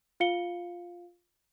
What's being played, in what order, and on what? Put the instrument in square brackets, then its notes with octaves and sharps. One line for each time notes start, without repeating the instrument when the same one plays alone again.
[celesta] F4 F5 C#7 G7